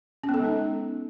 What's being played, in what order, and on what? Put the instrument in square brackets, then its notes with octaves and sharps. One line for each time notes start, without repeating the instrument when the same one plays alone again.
[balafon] C#4
B3
A4
G#3
D#4